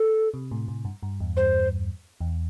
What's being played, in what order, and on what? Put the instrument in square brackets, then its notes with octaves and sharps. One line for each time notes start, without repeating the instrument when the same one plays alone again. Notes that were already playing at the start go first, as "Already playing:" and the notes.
Already playing: [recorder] A4
[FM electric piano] C3
A2
A2
G2
G2
E2
[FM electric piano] G2 [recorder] C5
[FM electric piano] E2